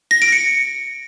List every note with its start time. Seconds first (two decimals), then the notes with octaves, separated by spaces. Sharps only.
0.11 A#6
0.22 D7
0.32 C#7